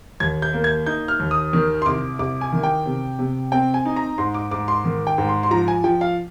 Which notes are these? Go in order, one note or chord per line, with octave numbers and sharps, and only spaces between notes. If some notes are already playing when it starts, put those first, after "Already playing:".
D#2 G#6
G6
A#3
G#6
D#4 G6
F6
D#2
D#6
D#3
C6
C2 D6
C2 D6
G#5
D#3
G5
C3
C3
C4 G5
G#5
D#4
A#5
G#2 C6
D6
G#2 D6
C6
D#3
G5
G#2
C6
C6
F3 A#5
G#5
F3 G5
F5